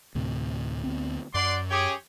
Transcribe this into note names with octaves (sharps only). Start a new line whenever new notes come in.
D2 A2 C3
D2 B3 C4
F#2 D5 F#5 C6
G4 G#4 C#5